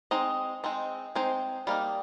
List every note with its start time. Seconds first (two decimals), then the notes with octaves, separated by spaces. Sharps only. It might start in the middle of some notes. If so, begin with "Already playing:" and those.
0.11 G#3 C4 D#4 D#5
0.64 G#3 C4 D#4
1.15 G#3 C4 D#4 C5
1.67 G3 A#3 D#4